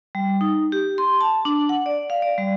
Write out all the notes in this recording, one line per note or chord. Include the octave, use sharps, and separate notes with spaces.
G3
D#4
G4
C6
A5
D4
F#5
D5
F5
D5
G3